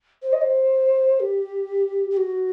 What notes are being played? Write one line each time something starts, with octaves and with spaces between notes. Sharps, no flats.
C5
D#5
C5
G4
G4
F#4